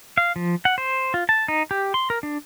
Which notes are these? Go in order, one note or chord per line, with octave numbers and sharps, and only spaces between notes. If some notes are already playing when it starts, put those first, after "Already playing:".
F5
F3
F#5
C5
F4
A5
D#4
G4
C6
A#4
D4